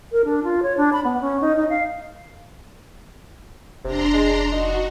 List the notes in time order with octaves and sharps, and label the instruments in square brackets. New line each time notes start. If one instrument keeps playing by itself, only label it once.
[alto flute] A#4
D4
F4
C#5
D4
B5
B3
C#4
D#4
D#4
F5
[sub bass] F1 [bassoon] C3 [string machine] D4 A#5 C6
[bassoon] G#3
[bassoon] D#4 [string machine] F#4